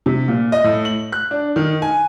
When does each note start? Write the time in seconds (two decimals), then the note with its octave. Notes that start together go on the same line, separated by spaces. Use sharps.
0.06 C3
0.28 A#2
0.52 D#5
0.64 A2
0.85 F#7
1.12 F#6
1.31 D4
1.56 D#3
1.82 G#5